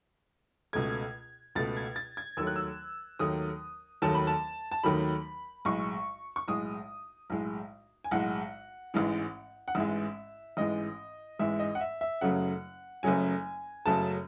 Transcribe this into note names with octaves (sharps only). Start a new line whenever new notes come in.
C#2 B2 A3 G#6
C#2 B2 A3 A6
G#6
A6
G#6
D#2 D#3 F#3 A3 E6
F#6
E6
D#2 D#3 F#3 A3 D#6
D#2 D#3 F#3 A3 A5
B5
A5
A5
D#2 D#3 F#3 A3 B5
B1 A2 G#3 C#6
C#6
B1 A2 G#3 D#6
B1 A2 G#3
G#5
B1 A2 G#3 F#5
A1 G#2 E3 G#3
F#5
A1 G#2 E3 G#3 E5
A1 G#2 E3 G#3 D#5
A1 G#2 E3 G#3 E5
D#5
F#5
E5
E5
F#1 F#2 C#3 F#3 A3 F#5
F#1 F#2 C#3 F#3 A3 G#5
F#1 F#2 C#3 F#3 A3 A5